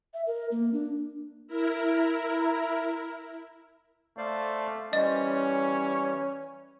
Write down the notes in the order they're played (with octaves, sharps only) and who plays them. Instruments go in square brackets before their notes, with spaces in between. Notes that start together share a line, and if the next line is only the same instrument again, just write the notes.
[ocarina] E5
A#4
A#3
D4
[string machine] E4 A#4
[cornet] A3 [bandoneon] C5 D5 F5
[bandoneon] E3 G3 [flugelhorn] C#4 [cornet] C5 [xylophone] D#5
[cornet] C#5